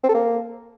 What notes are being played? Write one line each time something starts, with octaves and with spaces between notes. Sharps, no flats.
C4
A4
A#3